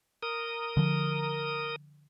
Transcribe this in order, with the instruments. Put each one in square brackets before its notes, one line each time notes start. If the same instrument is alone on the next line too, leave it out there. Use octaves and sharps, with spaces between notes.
[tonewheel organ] A#4 D#6
[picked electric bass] D3 F3